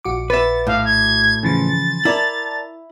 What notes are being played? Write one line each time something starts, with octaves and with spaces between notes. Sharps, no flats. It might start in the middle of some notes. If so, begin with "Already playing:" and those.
A#1 F#4 D6
B4 E5 A6
A2 F5
G#6
C#3 E3 F3 A6
E4 A#4 D5 A5